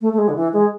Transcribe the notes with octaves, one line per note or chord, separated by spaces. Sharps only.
A3
A3
G#3
D3
E3
G#3